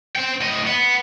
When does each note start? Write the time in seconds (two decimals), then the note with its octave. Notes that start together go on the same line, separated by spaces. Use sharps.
0.16 C5 G5
0.41 A2 D#5
0.67 B3